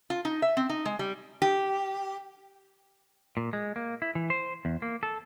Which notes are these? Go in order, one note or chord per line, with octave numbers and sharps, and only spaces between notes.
F4
D#4
E5
C4
D#4
G#3
G3
G4
A#2
G#3
A#3
E4
E3
C5
E2
A#3
A4